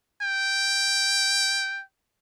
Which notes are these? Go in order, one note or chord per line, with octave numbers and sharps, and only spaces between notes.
G5